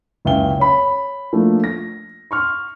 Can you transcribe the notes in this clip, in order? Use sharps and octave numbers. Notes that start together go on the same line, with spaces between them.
F#1 C#2 E5 F5 G5 G7
C#5 B5
F3 A3 A#3 D4
A#6
C6 C#6 F6